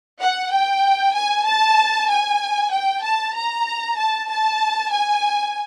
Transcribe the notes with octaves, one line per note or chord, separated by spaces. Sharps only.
F#5
G5
G#5
A5
G#5
G5
A5
A#5
A5
A5
G#5